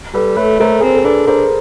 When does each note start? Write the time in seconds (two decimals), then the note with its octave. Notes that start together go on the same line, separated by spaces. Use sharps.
0.14 G3 A4 B4
0.36 A3 B4 C#5
0.60 A3 A#4 C5
0.80 C4 G#4
0.88 A4
0.96 A#4
1.04 D4 A4 B4
1.27 D4 A#4 C5